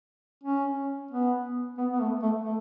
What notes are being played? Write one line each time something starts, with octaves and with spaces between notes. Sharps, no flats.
C#4
B3
B3
B3
A3
A3
A3